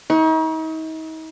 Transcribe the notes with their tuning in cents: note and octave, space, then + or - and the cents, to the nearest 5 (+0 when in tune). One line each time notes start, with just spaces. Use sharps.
D#4 +40 C#6 +0